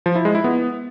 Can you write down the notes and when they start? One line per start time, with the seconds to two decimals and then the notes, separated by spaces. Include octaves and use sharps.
0.06 F3
0.15 E4
0.25 G#3
0.35 E4
0.44 B3